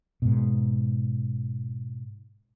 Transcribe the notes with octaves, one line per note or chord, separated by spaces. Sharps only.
G#2 B2